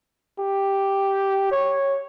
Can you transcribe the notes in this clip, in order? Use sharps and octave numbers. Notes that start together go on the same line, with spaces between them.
G4
C#5